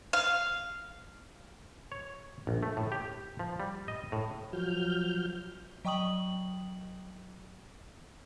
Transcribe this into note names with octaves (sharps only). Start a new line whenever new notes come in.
F5
C#5
A#1
A3
A2
G4
F3
G3
D#5
A2
F3 F#3 F6 G6
F#3 D#5 G5 C#6 D#6 F#7